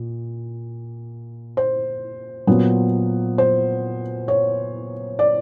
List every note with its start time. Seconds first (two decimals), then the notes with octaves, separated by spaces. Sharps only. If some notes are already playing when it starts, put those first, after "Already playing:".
Already playing: A#2
1.57 C5
2.47 A#2 F#3 B3
3.38 C5
4.28 C#5
5.19 D5